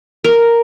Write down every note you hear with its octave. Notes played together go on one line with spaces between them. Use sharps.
A#4